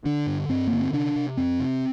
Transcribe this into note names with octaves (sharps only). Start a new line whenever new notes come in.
D3 D4
G2
G2 C4
D3 A#3
C4
C3 D4
C3
F2 C4
C3